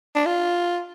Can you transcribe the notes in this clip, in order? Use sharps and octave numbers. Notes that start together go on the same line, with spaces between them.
D4
F4